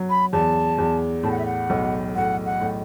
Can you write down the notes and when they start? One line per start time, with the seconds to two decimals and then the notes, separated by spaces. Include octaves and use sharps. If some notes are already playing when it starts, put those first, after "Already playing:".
Already playing: F#3
0.10 B5
0.33 E2 A5
0.78 E2
1.23 A2 A5
1.31 F#5
1.38 E5
1.46 F#5
1.70 B1
2.15 A2 F#5
2.46 F#5
2.61 A2